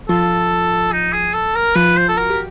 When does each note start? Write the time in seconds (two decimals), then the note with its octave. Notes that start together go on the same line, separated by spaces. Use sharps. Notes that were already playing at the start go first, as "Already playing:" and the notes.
0.09 F3 F4 A4
0.92 D#4
1.13 G#4
1.34 A4
1.55 A#4
1.76 F3 F4 B4
1.97 C5
2.09 A4
2.17 F#4 A#4
2.30 G4